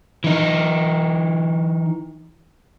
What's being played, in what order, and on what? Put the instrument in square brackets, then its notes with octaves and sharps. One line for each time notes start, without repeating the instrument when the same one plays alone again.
[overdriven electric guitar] E3 D#4